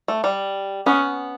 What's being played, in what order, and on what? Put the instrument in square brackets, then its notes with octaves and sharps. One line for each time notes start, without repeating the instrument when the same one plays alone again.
[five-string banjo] A3
G3
[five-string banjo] B3 [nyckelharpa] C#4